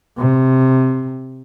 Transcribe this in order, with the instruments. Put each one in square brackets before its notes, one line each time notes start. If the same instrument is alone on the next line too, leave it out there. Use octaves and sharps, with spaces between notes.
[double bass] C3